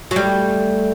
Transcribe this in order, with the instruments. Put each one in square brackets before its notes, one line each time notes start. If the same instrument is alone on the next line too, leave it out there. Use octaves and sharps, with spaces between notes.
[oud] F#3
[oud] G3 [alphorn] A3